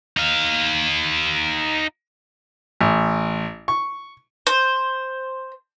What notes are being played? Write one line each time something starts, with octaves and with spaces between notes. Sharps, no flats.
D#4 F5
A1
C#6
C5